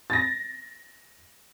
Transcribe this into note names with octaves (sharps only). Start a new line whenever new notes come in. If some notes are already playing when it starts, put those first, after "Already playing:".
A6 A#6